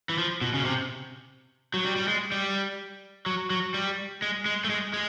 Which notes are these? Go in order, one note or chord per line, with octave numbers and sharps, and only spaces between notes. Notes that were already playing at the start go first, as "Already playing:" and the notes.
E3
F3
B2
C#3
C3
F#3
G3
G3
G#3
G3
F#3
F#3
G3
G#3
G#3
A3
G#3
G#3